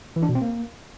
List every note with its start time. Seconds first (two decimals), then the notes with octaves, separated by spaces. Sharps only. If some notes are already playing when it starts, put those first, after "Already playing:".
0.16 E3
0.23 D4
0.29 B2
0.35 C4
0.42 A#3